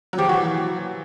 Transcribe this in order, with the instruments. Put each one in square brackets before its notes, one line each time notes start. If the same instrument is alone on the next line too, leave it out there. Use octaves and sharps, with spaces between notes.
[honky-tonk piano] F#3
[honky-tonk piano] F3 G3 [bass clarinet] G4
[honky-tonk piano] E3 F#3 [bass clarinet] F#4